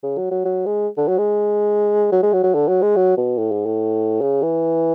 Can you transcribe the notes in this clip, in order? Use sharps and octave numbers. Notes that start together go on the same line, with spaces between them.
C#3
F#3
F#3
F#3
G#3
D3
F#3
G#3
F#3
G#3
F#3
F#3
D3
F#3
G#3
F#3
B2
A2
G#2
A2
C#3
E3